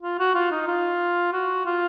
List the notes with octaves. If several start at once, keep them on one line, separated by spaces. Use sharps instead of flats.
F4
F#4
F4
D#4
F4
F#4
F4